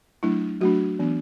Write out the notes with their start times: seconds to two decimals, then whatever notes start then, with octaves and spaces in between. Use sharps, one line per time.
0.23 F#3 A3 D4 E4
0.61 F#3 A3 D4 F#4
0.99 E3 B3 D4